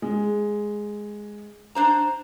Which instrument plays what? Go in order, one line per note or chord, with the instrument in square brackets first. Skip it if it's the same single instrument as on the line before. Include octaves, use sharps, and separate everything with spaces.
[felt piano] G#3
[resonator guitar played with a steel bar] D4 C5 A#5